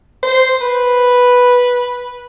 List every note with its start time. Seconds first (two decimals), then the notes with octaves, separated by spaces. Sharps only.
0.23 C5
0.61 B4